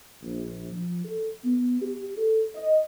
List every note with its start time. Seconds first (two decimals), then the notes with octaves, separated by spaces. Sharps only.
0.22 A#1
0.71 F3
1.05 A4
1.44 B3
1.82 G4
2.17 A4
2.55 D#5